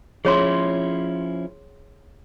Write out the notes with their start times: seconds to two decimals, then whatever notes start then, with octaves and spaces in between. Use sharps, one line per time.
0.25 F3 C#4 E4 G#4 C#5 C6